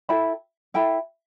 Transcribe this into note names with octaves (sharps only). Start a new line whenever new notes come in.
E4 A4 G5 B5
E4 A4 G5 B5